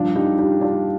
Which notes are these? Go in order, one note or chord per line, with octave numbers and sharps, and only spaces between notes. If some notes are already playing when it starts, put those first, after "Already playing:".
Already playing: G2 F3 D4 F4
D#4 G4
D#4 G4
D4 F4